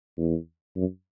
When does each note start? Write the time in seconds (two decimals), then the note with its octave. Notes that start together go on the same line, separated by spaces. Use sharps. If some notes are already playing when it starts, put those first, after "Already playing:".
0.18 E2
0.76 F#2